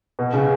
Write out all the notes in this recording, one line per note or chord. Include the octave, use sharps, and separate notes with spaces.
B2
C#3